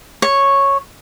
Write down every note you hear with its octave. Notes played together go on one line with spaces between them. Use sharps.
C#5